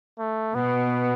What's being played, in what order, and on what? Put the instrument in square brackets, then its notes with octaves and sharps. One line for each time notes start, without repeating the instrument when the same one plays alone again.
[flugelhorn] A3
[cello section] B2 [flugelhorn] B3